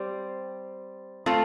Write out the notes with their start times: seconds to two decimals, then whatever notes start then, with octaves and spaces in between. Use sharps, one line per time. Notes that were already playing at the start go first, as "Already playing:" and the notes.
Already playing: G3 C4
1.26 A3 C4 F4 A4